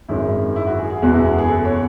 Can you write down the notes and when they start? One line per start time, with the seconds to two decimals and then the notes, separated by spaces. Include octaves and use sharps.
0.09 G#1 F#2 D#3 G#3 E4
0.56 E4
0.67 F#4
0.79 G#4
0.90 G#4
1.02 F#1 E2 B2 G#3 B3 F#4
1.14 E4
1.25 G#4
1.38 G#4
1.49 A4
1.65 C#5